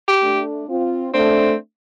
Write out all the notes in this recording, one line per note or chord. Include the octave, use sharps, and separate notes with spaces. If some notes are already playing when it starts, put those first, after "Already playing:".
G4
A3 D4
C4 F4
A3 C4 D4